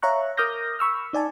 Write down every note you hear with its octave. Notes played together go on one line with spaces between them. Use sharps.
C#5 E5 F5 A#5 C#6 F#6
A#4 D6 D#6 F6 G6 A#6
B5 C#6 E6 F6
D#4 D5 G#5 A5